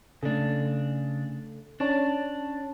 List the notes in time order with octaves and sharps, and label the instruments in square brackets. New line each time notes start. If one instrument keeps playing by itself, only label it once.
[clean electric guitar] C#3 D4 [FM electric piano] A3 A4
[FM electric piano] C#4 C#5 A5 [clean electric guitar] D4